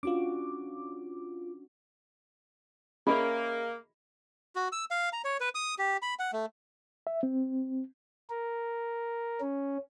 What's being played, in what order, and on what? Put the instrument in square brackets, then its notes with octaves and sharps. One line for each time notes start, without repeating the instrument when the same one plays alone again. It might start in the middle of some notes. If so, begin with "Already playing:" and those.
[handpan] C#4 D4 F#4 [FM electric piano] F4 D6
[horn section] A#3 [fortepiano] C#4 A#4 E5 [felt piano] G#4 D#5 [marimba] B5
[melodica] F#4
E6
F5
A#5
C#5
B4
D#6
G4
B5
F#5
A3
[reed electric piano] E5
C4
[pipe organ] A#4
C#4